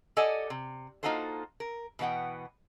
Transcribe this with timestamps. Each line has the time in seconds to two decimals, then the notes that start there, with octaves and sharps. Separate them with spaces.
0.17 G4 A4 D5 D#5 F#5 G#5
0.50 C3
1.03 A#3 D#4 F4 F#4 A4 C5
1.60 A#4
1.99 B2 E3 B3 F#5 G5